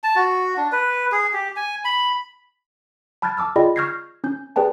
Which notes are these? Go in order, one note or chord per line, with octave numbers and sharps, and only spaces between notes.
A5
F#4
D4
B4
G#4
G4
G#5
B5
A5 B5 F6 F#6 G#6 A6
A5 D6 E6 F6
F4 G#4 D5 D#5 G5 B5
C#6 F6 G6 G#6 A#6 C7
C#4 G6
G4 G#4 B4 D5 G5 A5